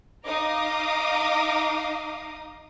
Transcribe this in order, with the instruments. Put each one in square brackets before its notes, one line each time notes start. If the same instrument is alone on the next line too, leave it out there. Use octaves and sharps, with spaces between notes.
[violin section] D#4 D#5 F5 A#5 D6 D#6